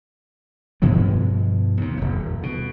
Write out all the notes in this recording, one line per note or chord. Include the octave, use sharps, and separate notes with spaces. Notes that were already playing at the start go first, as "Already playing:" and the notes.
G2 B2 F3 G#3
D#2 C3
D#1 G#1
B2